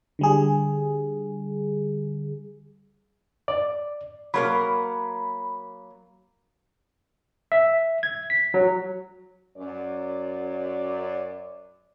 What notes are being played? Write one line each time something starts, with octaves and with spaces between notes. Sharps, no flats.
D3 G3 G#4
D5
F#3 A#3 A#4 B5
E5
G#6
B6
F#3
F#2 D5